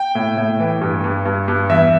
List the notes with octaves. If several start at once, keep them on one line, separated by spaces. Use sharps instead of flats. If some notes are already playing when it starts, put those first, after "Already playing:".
Already playing: G5
A2
A2
E3
G2
G2
G2
G2
E2 E5